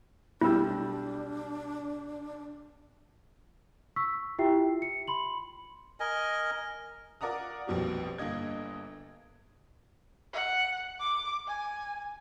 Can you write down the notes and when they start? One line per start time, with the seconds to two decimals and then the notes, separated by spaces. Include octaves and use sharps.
0.41 B1 G3 D4 E4 E6
3.96 C#6 E6 B6
4.38 E4 F4 G4 E5 G5 C7
4.82 C#7
5.08 B5 C6 F#7
6.00 A#4 D#5 G#5
7.21 F4 A#4 D5 F#5 A#5 D#6
7.67 A#1 F2 B2 F#3 G3
8.18 G1 D3 A#3 D#5 G#6
10.33 F#5
11.00 D6
11.47 G#5